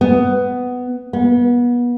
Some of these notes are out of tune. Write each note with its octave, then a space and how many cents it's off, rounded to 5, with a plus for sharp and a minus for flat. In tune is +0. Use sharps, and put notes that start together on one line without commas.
B3 +10
B3 -30